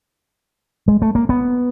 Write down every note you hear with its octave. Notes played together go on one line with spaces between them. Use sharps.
G#3
A3
A#3
B3